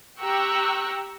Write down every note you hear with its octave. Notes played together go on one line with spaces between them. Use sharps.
G4 G5 A#5 C#6 E6 F#6